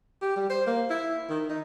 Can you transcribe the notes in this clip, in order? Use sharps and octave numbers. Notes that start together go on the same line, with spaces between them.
G4
G3
C5
A#3
E4
D#3
D#4